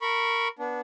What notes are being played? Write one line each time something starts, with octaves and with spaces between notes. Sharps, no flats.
A#4 B5 C#6
B3 D4